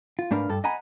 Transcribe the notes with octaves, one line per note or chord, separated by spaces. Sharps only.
F4
G#2 A3 D4 A#4 B4 F5
G2 A4
D#5 F#5 G#5 A#5 B5